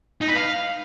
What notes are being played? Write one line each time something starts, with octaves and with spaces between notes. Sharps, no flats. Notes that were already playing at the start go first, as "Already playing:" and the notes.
D#4
B4
F5